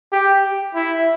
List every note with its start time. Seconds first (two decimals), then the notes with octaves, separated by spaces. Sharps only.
0.12 G4
0.75 E4